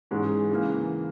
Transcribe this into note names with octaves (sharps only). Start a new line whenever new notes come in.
G#2 E3 G#3 C#4
C#3 E3 A#3